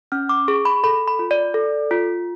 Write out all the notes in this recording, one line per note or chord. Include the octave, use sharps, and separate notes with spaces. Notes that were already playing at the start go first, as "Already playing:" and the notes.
C#4 F6
D6
G#4 C#6
B5
A4 B5
B5
F4
D5
A4
F4